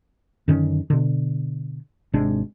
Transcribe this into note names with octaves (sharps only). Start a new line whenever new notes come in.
F#2 D3 D#3 C#4
B2 D3
G#1 C3 G#3 D4